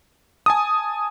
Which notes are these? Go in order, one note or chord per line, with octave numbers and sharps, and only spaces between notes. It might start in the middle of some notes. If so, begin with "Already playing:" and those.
G#5 A5 D#6